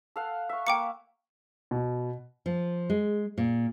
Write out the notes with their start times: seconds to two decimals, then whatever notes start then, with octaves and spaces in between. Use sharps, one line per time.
0.16 A4 F5 F#5
0.49 E5 C#6
0.67 A#3 G5 D6 C#7
1.71 B2
2.46 F3
2.90 G#3
3.38 A#2